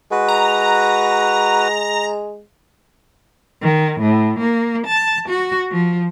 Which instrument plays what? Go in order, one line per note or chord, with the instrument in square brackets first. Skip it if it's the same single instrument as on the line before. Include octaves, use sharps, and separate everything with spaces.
[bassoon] G#3 [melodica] F#4 B4
[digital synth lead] A#5
[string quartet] D#3
A2
A#3
A5
F#4
F3